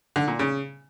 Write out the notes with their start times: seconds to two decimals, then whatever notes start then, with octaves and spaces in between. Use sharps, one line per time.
0.16 D3
0.28 A#2
0.39 C#3